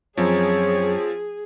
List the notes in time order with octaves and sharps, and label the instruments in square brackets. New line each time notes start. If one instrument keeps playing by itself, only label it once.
[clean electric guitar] F#2 [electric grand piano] F3 C4 [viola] G#4 [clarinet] C#5